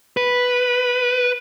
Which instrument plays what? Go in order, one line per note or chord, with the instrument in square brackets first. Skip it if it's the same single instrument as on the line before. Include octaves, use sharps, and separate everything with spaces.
[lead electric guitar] B4